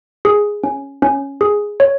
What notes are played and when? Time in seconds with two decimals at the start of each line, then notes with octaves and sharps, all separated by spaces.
0.25 G#4
0.64 C#4
1.02 C#4
1.41 G#4
1.80 C#5